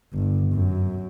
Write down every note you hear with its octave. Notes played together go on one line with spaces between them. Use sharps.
G1
F#2